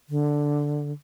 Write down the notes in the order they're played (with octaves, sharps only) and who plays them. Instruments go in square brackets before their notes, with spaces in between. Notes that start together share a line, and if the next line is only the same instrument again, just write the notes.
[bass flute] D3